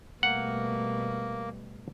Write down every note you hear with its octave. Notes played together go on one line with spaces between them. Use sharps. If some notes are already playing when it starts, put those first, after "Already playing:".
B2 G3 A3 A#3 F#5